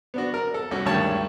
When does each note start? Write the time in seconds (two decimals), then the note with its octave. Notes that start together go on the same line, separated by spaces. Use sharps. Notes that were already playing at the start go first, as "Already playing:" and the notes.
0.14 B3 D4 F#4
0.34 A#4
0.54 A4
0.71 C2 C#4 F#4
0.85 G#1 D2 G2 D#3 C#5 A5